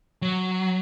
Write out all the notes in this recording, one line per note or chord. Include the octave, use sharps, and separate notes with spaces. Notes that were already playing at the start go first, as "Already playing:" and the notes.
F#3